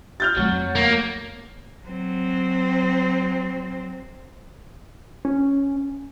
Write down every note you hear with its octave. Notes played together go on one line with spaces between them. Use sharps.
F6 G6 A6
F2 F#3 A3
A#3
F#3 C4
C#4